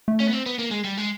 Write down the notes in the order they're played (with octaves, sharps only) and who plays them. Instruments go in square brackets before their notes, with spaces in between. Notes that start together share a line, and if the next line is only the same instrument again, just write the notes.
[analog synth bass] A3
[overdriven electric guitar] C#4
B3
C4
B3
A#3
G#3
G3
G#3